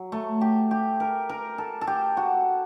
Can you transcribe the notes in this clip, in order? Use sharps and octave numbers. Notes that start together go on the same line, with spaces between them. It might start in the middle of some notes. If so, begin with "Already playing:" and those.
Already playing: F#3
A3
G4
G4
A#4
A#4
A4
A4
G4
F#4